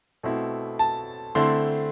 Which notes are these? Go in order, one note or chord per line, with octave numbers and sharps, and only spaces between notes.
B2 A3 C4 E4
A5
D3 A3 C4 E4 C6